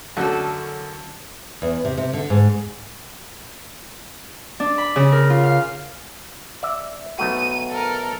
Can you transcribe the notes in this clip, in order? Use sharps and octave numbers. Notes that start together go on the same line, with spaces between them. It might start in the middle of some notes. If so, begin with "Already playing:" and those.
F#2 D3 A3 C#4 F#4 A4
E2
C3
C3
D3
G#2
D4
B5
C#3
A#4
F4
F5
D5 E5
B1 A3 F#4 D#7
A4 A#4